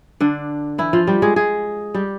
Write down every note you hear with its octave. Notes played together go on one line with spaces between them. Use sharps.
D3 D4
E3 E4
F3 F4
G3 G4
G#3 G#4
G#3 G#4
G3 G4